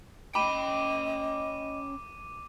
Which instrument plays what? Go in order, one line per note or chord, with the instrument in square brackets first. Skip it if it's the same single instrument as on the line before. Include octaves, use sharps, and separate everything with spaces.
[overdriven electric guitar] C#4 G5 [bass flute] D#5 [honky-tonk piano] B5 [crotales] D6 D#7